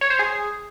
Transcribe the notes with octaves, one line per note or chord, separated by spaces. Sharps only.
C#5
C5
G#4